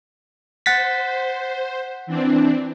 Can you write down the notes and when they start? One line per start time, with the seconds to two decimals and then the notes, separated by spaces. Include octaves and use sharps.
0.66 C5 F#5 A6 B6
2.07 E3 C4 D4